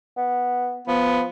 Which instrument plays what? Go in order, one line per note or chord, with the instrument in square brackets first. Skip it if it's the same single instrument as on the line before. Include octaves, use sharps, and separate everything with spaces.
[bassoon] B3
[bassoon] F3 [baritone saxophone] B3